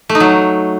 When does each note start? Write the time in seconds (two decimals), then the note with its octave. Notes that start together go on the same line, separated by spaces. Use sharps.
0.09 A3
0.15 D#4
0.20 F#3